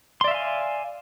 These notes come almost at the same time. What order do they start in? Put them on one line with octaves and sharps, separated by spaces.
C6 D5 E5 F5 G#5